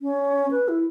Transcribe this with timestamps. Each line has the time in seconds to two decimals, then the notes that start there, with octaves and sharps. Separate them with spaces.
0.02 C#4
0.51 B4
0.68 E4